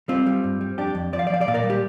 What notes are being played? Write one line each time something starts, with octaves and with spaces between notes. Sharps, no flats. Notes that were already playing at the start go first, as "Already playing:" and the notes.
G3 C4 F4
G3
G2
G3
F2 D4 G4
F2
F3 D5
F5
D5
F3 F5
D5
A#2 F5
A#4 D5
G3
G4